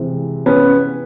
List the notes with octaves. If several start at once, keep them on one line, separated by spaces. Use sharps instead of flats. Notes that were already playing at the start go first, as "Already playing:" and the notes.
Already playing: C3 E3 G#3 C4
B3 C#4